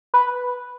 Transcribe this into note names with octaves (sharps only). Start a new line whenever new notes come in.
B4